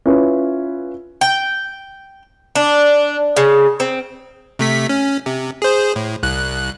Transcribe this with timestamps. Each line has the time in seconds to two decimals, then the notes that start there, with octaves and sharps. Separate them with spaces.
0.06 C#4 E4 F4 B4
1.21 G5
2.55 D4
3.37 C#3
3.80 C4
4.59 C3 A3 B6
4.89 C#4
5.26 C3
5.62 G#4 C5
5.96 A2
6.23 C2 F#6